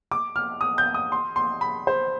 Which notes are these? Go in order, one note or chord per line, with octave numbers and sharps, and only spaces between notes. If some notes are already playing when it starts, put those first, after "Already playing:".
D6
F6
D#6
G6
D#6
C6
C6
B5
C5